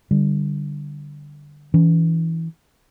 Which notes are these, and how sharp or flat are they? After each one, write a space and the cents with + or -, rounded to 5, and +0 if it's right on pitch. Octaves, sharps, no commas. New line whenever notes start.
D3 +0 G3 +0
E3 -10 C#4 +35